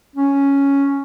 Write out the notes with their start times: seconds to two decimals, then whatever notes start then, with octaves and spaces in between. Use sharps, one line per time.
0.16 C#4